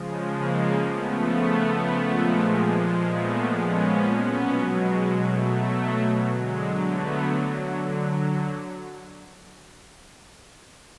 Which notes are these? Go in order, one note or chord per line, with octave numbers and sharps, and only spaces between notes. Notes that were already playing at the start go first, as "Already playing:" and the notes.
Already playing: C#3 F3 G#3
G#3 A#3
A3 B3
A#2 F3 G#3
A3 B3
B3 C#4
B2 F#3 B3 C#4
G#3
A3
D3 F#3 G#3
A3 B3